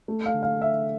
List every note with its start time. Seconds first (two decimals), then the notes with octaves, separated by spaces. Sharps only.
0.08 A3
0.26 F5
0.34 D3
0.43 F5
0.61 D3 E5